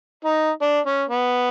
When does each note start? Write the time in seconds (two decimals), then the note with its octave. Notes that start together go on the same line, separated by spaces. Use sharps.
0.25 D#4
0.62 D4
0.86 C#4
1.09 B3